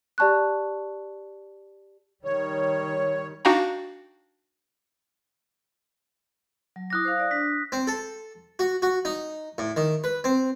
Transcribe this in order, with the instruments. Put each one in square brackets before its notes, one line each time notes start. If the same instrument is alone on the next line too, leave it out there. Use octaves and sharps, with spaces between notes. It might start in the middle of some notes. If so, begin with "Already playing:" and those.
[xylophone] G4 D5 A5 C#6 F#6
[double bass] D#3 G3 [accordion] C#5
[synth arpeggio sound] D4 D#4 F#4 F5 G5 A#5
[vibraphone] F#3
[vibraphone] E4 D6 [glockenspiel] D#6 F#6 A#6
[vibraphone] C5 F5
D5
[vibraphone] D4 [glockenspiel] B6
[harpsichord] C4
A4
F#4
F#4
D#4
A2
D#3
B4
C4